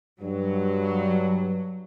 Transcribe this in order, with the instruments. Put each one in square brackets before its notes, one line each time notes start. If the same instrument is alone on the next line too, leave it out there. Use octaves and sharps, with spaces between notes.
[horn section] G2 [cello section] F#3